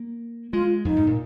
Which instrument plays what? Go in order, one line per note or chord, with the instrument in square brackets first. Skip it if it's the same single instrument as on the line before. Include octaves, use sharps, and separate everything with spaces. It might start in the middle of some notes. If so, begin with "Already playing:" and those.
Already playing: [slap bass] A#3
[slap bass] G#3 [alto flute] F4
[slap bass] F2 [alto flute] D#4
[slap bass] G#2
A#2